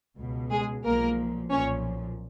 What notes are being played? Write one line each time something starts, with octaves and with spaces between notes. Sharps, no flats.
C#2 B2
G#3 G#4
B1 A#2 F3 A#3 A#4
B1 A#2 F3 C#4 C#5